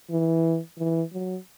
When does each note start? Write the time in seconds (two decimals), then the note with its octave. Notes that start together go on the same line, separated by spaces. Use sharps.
0.10 E3
0.79 E3
1.13 F#3